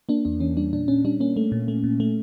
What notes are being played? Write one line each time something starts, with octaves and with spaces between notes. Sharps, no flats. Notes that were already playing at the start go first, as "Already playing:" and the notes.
A#3 D4
E2 D4
E3 C#4
G3 D4
A#2 D4
A#2 C#4
G3 D4
A#3 C#4
A3
A#2
A3
A#2
A3